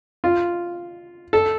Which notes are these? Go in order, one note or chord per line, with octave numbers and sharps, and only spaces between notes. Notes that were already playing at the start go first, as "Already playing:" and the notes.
F4
A4